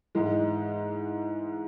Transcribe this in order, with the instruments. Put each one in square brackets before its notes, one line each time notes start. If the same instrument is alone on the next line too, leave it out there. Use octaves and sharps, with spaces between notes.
[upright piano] G#2 E3 G#3